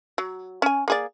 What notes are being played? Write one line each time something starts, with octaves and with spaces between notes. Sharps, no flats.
F#3
C#4 G#5
A#3 G#4 D5